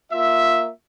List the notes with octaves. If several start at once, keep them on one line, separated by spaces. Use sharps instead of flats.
A#3 F4 E5